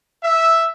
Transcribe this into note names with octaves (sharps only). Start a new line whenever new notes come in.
E5